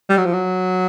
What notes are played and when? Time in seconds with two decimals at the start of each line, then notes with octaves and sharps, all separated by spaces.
0.09 G3
0.17 F#3
0.25 F3
0.33 F#3